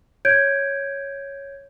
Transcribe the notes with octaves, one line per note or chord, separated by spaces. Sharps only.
C#5 G6 G#6 D7